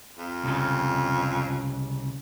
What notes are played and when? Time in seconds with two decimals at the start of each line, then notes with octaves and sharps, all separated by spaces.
0.18 F2
0.44 C2 C#3